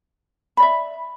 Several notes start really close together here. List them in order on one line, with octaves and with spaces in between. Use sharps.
B5 D5 E5